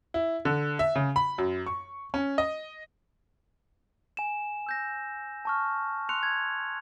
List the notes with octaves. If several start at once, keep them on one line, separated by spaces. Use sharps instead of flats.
E4
D3
E5
C#3
B5
F#2
C#6
C#4
D#5
G#5 E7
E6 G6 A#6
A5 C#6 F6
C6 E6 F#6 C#7 F7
G#6